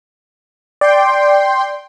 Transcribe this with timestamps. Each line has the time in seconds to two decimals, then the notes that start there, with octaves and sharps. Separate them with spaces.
0.81 D5 G5 C6